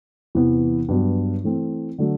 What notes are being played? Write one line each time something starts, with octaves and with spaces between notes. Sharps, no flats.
E2 C3 E3 B3
G2 F#3 B3
E3 A3 C4
D3 F#3 A3 D4